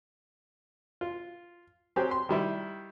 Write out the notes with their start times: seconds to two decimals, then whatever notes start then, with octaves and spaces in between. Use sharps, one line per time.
1.01 F4
1.96 F#3 C4 G4 G#4
2.11 C6
2.29 D#3 G3 E4